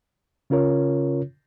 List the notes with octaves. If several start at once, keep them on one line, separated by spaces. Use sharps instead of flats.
C#3 C#4 F4 A#4 C#5